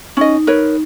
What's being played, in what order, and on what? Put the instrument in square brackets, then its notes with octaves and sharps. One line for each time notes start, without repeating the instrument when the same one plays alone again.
[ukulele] C#4 D#5 [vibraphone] D#4
[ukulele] A#4 B4 C#5